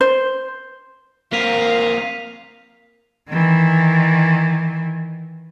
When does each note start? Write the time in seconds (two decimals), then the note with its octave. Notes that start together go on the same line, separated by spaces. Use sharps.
0.01 C5
1.33 A#3 C4 A#4 F5 B6 D#7 F7
3.29 D#3 E3